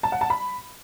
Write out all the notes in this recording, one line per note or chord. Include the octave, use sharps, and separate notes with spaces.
A5
F#5
A5
B5